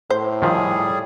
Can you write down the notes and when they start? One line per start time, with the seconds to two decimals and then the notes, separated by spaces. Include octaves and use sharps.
0.10 A2 C5
0.42 D#3 F3 G3 G#4